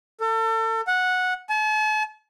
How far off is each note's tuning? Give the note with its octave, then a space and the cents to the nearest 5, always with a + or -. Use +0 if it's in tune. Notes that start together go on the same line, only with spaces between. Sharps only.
A4 +35
F#5 -10
A5 -45